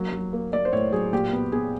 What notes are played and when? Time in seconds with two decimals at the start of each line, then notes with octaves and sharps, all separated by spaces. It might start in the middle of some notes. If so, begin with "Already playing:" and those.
Already playing: F#3 A#3
0.12 F#3
0.33 A#3
0.52 A#3 D5
0.65 C5
0.72 A2 C#5
0.92 F#3 G#4
1.13 A#2 G4
1.32 B3
1.52 B3 G#4